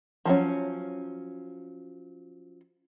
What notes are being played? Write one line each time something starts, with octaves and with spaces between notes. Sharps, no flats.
F3 F#3 C#4